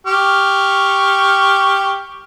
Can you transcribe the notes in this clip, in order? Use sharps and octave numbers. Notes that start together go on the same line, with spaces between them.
G4 C#6 F6